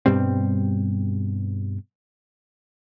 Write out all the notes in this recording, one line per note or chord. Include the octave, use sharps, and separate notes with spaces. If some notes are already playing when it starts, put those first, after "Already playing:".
G2 B2 G3 C4